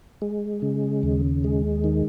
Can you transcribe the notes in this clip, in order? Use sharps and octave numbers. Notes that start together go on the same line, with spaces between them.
G#3
C#3
D#2
G#3
D#3